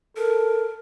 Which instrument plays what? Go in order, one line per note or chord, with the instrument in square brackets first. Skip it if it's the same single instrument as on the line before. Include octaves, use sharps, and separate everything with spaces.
[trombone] A4 [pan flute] A#4